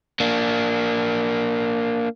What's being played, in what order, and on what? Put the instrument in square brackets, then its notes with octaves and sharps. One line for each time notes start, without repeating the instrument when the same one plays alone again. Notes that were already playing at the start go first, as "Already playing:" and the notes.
[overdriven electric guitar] A#3 D4